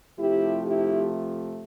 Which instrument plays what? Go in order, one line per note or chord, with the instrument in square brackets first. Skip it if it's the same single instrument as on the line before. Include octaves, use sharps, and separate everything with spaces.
[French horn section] C3 F3 A3 E4 G4
E4 G4